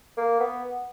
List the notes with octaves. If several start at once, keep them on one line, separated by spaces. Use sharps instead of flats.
A#3
B3